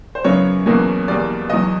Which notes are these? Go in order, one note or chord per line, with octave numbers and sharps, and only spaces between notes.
C5
F#2 C#3 F#3 B3 C#5
E2 B2 F#3 A#3 C#4
E2 B2 G3 A#3 D5
E2 B2 F#3 D#5